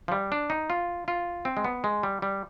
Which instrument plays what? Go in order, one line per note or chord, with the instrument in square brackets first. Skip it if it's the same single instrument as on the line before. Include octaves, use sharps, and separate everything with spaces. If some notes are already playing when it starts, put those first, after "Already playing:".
[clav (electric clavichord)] F3
G3
D4
D#4
F4
F4
C4
G#3
B3
G#3
G3
G3